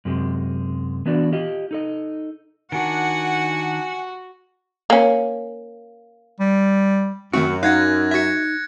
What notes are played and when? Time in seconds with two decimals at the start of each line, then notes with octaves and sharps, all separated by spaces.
0.05 F#2 C3 G#3
1.06 E3 B3 D4 F#4 D5
1.32 F4 G4 D#5
1.71 D#4 A4 D#5
2.72 D#3 D4 F#4 F#5 G#5
4.90 A#3 C#4
6.40 G3
7.33 F#2 D#3 A3 C4 F#4
7.63 D#4 F5 F#5 F#6 G#6 A#6
8.11 F#4 E5 G#6 C#7